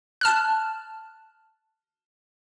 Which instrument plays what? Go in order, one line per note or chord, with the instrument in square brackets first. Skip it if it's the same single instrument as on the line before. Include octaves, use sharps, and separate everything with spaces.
[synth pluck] A5 F6 F#6